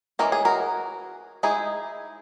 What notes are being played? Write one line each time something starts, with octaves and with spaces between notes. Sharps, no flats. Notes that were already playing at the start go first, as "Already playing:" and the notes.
E3 G#3 C#4 A#4
G#4
F#4 A#4
G#3 D#4 E4 G#4